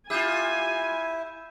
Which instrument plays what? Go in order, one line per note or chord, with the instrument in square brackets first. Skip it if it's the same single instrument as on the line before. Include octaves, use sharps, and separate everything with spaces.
[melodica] E4 [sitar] F4 G4 [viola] G#5 [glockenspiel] E6 G6 E7